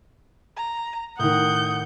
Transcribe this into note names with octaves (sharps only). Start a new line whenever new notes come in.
A#5
A2 D#3 F#5 D#6 G6